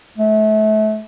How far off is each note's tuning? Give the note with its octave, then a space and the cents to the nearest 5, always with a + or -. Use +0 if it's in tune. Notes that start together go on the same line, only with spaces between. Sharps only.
A3 -30